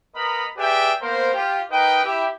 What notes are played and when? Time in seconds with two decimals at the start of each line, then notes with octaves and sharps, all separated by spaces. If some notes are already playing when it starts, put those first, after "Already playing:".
0.15 B3 A#4 D#5 A#5 B5
0.57 G4 G#4 B4 D5 E5 G5
1.01 A#3 B3 A#4 C5
1.34 F4 G4
1.71 D#4 A#4 B4 D#5 G5
2.05 E4 G4